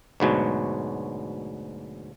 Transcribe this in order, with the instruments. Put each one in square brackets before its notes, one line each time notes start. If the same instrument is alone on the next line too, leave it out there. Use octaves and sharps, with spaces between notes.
[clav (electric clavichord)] D2 G#2 B2 F#3